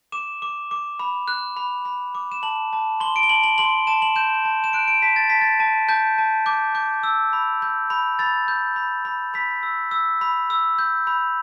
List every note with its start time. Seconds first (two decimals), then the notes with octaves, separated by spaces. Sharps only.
0.12 D6 E7
0.42 D6
0.71 D6
0.99 B5
1.28 F#6
1.57 B5
1.85 B5
2.15 D6
2.32 E7
2.43 A5 F#7
2.73 A5
3.00 C6 G7
3.16 D7
3.23 G7
3.29 A5 F#7
3.44 F#7
3.58 C6 F#7
3.87 A5 E7
4.02 F#7
4.16 G6 E7
4.45 A5
4.64 E7
4.73 F#6 D7
4.87 D7
5.02 A5 B6
5.16 A6
5.30 A5 B6
5.41 A6
5.60 A5
5.89 A5 G6
6.18 A5
6.46 D6 G6
6.75 D6 G6
7.03 E6
7.33 B5
7.62 G6
7.90 B5
8.19 B5 A6
8.48 G6
8.76 B5
9.05 B5
9.34 B5 B6
9.63 E6
9.91 E6
10.21 B5
10.50 E6
10.79 G6
11.07 B5